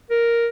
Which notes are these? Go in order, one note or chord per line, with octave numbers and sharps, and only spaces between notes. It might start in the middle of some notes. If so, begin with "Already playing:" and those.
A#4